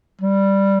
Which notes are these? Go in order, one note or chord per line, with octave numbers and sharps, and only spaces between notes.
G3